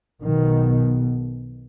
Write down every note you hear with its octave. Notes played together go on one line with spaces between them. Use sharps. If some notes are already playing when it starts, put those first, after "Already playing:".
B1 B2 D#3